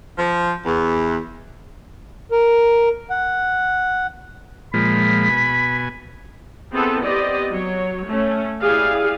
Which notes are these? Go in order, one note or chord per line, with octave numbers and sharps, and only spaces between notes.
F3
E2
A#4
F#5
A#2 F3 G#3 B5
B2 G#5
B3 C4 E4 G#4 A4 B4
B3 C4 G4 D5 D#5
F#3 C#5
A3 C#4
E4 G4 G#4 D5 F5